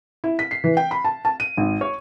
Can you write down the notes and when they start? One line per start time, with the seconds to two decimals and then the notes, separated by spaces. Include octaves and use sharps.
0.24 E4
0.39 B6
0.51 C7
0.64 E3
0.77 G5
0.91 B5
1.05 A5
1.25 A5
1.40 D#7
1.57 G#1
1.81 C#5